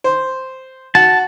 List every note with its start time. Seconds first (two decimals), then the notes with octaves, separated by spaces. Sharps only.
0.04 C5
0.95 F#4 F#5 A5